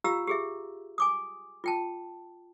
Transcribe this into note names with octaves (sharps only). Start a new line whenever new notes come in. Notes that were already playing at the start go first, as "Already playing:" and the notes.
F4 G4 F5 A#5 E6
G4 G#4 E5
G#5 D6 D#6
F4 G5 A5